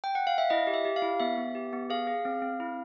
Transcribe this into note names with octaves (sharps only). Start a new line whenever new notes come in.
G5
F#5
F5
E5
E4 D#5
G4
E5
G4
F5
E4
B3 E5
B3
G4
B3
G#4 F5
G#4
C4
C4
E4